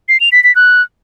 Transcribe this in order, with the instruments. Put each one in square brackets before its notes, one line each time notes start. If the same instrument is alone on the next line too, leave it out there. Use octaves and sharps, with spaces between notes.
[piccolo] C7
F7
B6
B6
F#6